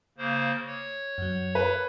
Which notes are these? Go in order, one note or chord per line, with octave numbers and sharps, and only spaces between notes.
C#3 A#3 C5
C#5
F#2 F#3
A#4 B4